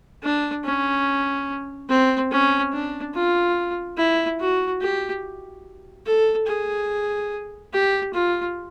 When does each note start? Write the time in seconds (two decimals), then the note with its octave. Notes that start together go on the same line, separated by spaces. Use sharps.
0.23 D4
0.64 C#4
1.89 C4
2.31 C#4
2.73 D4
3.14 F4
3.98 E4
4.39 F#4
4.81 G4
6.06 A4
6.47 G#4
7.73 G4
8.14 F4